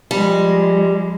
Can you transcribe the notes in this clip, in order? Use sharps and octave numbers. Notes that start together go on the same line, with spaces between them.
F3 G3 G#3